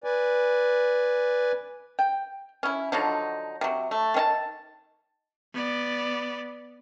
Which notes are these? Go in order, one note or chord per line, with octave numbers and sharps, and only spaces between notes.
B4 D5 G#5
G5
C#4 E4
D3 F3 F#3 D#4
C3 F#3
A3
D#3 C#4 A5
B3 D5